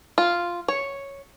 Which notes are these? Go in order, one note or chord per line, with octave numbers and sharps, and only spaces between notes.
F4
C#5